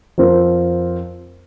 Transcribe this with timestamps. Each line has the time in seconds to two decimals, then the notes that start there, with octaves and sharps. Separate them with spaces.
0.18 F2 F3 C4 A#4